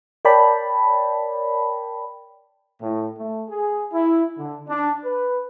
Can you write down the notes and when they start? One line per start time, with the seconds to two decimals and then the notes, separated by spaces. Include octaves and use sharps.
0.25 A#4 C#5 D5 G5 A5 B5
2.81 A2
3.16 A3
3.49 G#4
3.93 E4
4.38 D3
4.68 D4
5.05 B4